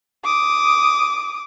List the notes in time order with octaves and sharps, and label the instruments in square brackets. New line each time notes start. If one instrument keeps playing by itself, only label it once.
[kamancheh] D6 D#6